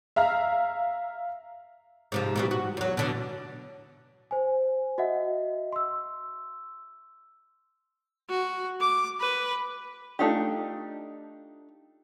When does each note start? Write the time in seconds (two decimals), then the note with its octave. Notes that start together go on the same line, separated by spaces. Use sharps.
0.16 E5 F5 A#5 F6
2.12 G#2 C3 F3
2.36 B2 E3 G3
2.51 F#4
2.77 E2 F#3
2.97 B2 D3 E3
4.31 C5 G#5
4.98 F#4 D#5 E5 F#5
5.73 C6 E6
8.29 F#4
8.80 D6
9.20 B4
10.19 A3 D4 D#4 F4 G4